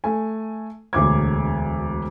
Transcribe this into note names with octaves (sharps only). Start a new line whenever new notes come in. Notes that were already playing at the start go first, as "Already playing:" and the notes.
A3 G#5
E1 D2 D6 G#6